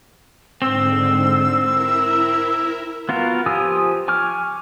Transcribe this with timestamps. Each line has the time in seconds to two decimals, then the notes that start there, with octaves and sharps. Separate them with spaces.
0.62 G#2 D3 C4 E6
1.62 E4 A#4 E5
3.09 B3 F4 F#4 A#4
3.46 F3 G4 G#5 D#6 E6
4.08 G#5 C#6 D6 F6